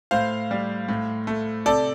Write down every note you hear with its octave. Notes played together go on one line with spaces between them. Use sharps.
A2 C5 F5
G3
A2
A3
C3 A4 D5